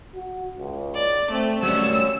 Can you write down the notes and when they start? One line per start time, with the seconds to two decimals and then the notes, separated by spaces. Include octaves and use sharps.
0.15 F#4
0.59 C#2
0.95 D5
1.32 A3 C4
1.63 F#3 G3 A3 C#4 E6